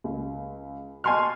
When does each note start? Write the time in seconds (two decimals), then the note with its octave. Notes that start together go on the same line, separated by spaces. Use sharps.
0.04 C#2
1.04 D#5 G#5 A5 C6 C#6 F6